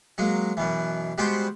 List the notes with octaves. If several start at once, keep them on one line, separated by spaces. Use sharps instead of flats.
F#3 G#3 A#3
F#2 B2 E3
G3 G#3 B3 F#4 G4 C5